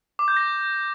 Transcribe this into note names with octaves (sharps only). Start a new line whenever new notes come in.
D6
G6
A#6